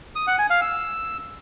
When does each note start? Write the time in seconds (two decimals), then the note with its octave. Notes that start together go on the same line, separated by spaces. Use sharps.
0.16 D#6
0.27 F#5
0.39 G#5
0.50 F5
0.62 E6